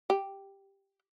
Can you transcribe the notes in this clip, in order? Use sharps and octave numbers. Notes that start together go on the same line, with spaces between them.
G4